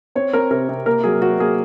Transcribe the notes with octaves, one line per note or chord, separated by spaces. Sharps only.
C4 C#5
C4 A#4
C3 A#4
C3
A#3 A#4
F#3 G#4
F#3 F#4
A#3 G#4